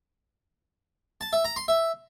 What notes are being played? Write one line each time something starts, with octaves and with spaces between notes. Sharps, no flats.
A5
E5
A#5
C6
E5